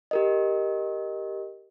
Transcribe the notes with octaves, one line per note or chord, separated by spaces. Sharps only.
G4 A#4 D#5